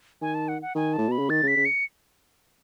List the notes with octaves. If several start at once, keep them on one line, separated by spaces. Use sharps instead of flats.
D#3 G#5
A5
F#5
F#5
D#3 G#5
A2 A5
B2 B5
C#3
D#3 A6
C#3
B6
C#3
C#7